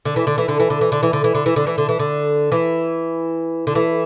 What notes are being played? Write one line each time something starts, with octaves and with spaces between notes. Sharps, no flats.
D3
E3
D3
E3
D3
E3
D3
E3
D3
E3
D3
E3
D3
E3
D3
E3
D3
E3
D3
E3
D3
E3